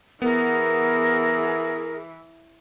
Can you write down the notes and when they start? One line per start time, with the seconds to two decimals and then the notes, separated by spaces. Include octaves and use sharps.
0.22 E3 B3 G#4 A#4